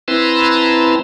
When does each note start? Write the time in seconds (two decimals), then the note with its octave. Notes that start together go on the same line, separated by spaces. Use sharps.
0.08 C4 E4 B4 A5 A#5 C6